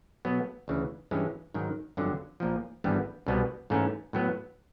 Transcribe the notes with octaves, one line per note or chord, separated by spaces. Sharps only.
B2 F#3 B3
D2 C#3 E3
G2 E3 G#3 C#4
G#2 D#3 F#3
G1 F2 D3 F#3
A#1 A#2 F3
G#1 G2 E3 G3 B3
C2 B2 G3 B3
G#2 E3 A3 C#4
A2 F#3 B3